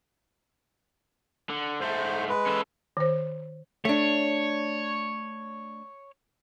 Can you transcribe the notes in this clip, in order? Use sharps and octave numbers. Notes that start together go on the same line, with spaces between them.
D3
G#2 A3 C5
G#3 B4
C#4 A4
D#3 C5
A3 D4 C#5